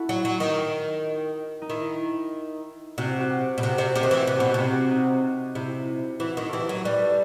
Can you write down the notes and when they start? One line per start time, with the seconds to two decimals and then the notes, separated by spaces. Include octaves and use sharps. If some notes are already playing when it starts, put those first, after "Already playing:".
Already playing: E4 F#4 A4
0.09 F#3
0.25 F#3
0.40 D#3
1.62 D#4
1.70 D#3 E4
2.98 C3 F#4
3.20 F#4
3.30 G4
3.58 B2
3.62 C3 F#4
3.73 G4
3.78 C3
3.84 F#4
3.95 C3 G4
4.03 D#3
4.06 E3 F#4
4.17 G4
4.27 C3 F#4
4.38 B2 G4
4.50 C3 F#4
4.60 G4
4.72 F#4
4.91 D#4
5.55 C3 E4
6.20 E3 F#4
6.37 D#3
6.48 E3 G4 A4
6.69 F#3
6.84 G3 B4
7.01 A4